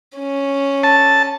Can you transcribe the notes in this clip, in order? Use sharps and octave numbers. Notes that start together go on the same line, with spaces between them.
C#4
A5